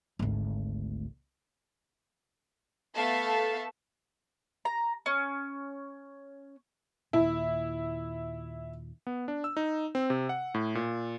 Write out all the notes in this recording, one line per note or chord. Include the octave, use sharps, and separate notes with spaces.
G#1 D2
A3 B3 A4 E5 F5 A5
A#5
C#4
D#2 A#2 E4
B3
D4
E6
D#4
C4
C3
F#5
A2
A#2